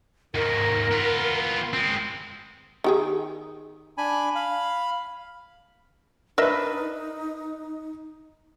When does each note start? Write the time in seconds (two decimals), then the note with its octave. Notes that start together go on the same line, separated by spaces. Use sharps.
0.35 D#2 G#2 A#4
0.91 B3 F4
1.73 G#3 C4
2.84 D#3 G4 G#4
3.98 D4 G#5 B5
4.35 F5 B5
6.38 D4 D#4 A#4 B4 D#5 E5